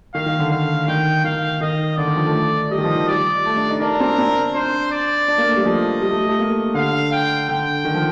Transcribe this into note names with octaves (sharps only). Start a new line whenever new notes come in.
D#3 F5
D#3
D3
D3 F5
D#3 G5
D#3 F5
D#3 D#5
D3 D5
D#3
F3
A3
G3 D#5
D#3
F3
D#3
G3 D5
A3
D4
D#4
D4 A#4
C4
C4
D4 C5
D5
D4
A#3
A3
G3
F3 D#5
G3
A3
G3
A3
A#3
D3 F5
G5
D3 G5
D#3
F3